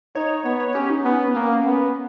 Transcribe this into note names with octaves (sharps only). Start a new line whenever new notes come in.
D#4 C#5
B3 C#5
C#5
C#4 G4
D#4
B3 C#4
B3
A#3 C#4
B3